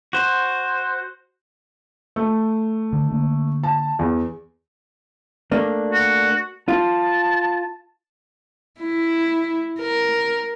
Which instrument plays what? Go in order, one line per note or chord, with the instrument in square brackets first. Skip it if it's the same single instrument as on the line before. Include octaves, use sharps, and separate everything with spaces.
[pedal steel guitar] F#4 C5
[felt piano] A3
[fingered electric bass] D3
D3 A#3
[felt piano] A5
E2
[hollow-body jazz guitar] A3 A#3 D4
[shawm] F#4
[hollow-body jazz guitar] F4 [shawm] A5
[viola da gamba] E4
A#4